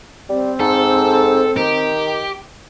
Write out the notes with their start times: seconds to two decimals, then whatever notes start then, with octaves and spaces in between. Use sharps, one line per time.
0.29 G3 C4
0.60 G#2 A4
1.57 D#3 G4